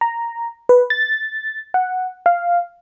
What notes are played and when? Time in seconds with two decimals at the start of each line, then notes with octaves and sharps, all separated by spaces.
0.01 A#5
0.69 B4
0.90 A6
1.74 F#5
2.26 F5